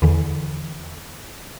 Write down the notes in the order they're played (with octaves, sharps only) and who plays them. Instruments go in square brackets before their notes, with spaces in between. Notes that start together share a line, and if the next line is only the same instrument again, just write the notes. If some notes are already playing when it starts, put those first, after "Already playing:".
[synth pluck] E2 D3 E3